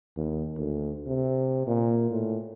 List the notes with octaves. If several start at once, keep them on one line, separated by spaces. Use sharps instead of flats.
D#2
D2
C3
A#2
A2